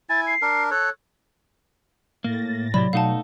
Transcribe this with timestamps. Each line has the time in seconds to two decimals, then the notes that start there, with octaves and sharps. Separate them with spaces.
0.09 E4 G#5 A6
0.27 C7
0.42 D4 A#4
0.71 A4 C#5 F#6
2.24 A2 A#3 A6 A#6
2.74 C3 F#3 E4 G4 D5 B5
2.93 B2 A3 D#4 F5 F#5 A5